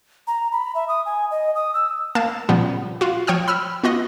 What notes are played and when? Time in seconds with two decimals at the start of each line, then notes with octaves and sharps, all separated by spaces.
0.27 A#5
0.52 B5
0.75 E5
0.88 D#6
1.06 G#5
1.31 D#5
1.55 D#6
1.74 E6
2.15 A#3 F5 A5 E7
2.49 A#2 C#3 F3 G3 B3
3.01 F4 F#4
3.27 F3 C#5 G5 D#6 F6
3.48 B5 E6 F6
3.84 B3 F4 F#4 D#5